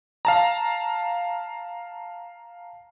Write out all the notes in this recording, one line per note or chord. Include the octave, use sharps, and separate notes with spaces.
F5 A5 A#5